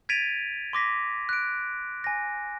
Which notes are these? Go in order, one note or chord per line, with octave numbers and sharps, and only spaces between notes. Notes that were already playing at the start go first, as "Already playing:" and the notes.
G#6 A6 B6 D7 D#7 F7
C6 D6 A#6 B6
F#6 D7
G#5 A#6